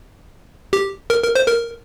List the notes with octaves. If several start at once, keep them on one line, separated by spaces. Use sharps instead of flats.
G4
A#4
A#4
C5
A#4